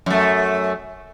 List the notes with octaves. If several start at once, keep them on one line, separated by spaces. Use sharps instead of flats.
F#2 A3